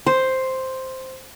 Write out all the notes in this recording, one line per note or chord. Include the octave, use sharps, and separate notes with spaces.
C5